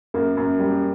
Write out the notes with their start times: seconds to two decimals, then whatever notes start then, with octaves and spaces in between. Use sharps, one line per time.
0.14 F#2 A#3
0.37 F#2
0.59 G3